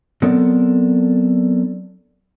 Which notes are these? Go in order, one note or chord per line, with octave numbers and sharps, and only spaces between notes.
F#3 B3 C4 D4 A4 A#4